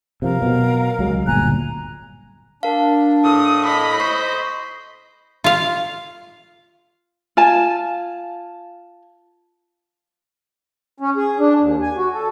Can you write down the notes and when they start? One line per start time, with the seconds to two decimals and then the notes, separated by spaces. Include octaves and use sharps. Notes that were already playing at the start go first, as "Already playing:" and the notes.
0.22 C3 F3 A#4 F5
0.41 B2 F#3
0.99 C#2 F#3 G#3
1.27 D1 G1 A#2 G#5 A#5 F#6
2.63 D4 A#4 F5
3.24 A2 D#6
3.64 D#5 B5
4.00 C5 C#6
5.44 F4 F5
7.37 F4 G#5 A5
11.00 C#4
11.17 G#4
11.39 D4
11.60 D#2
11.82 G#5
11.97 F#4
12.13 A4